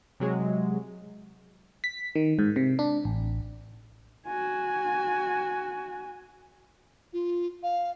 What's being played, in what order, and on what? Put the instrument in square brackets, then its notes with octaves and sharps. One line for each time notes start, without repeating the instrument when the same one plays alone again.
[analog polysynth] C3 F#3 G#3
[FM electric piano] B6
D#3
G#2
C3
D4
A1
[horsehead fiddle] F#4 G#5
[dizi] F4
F5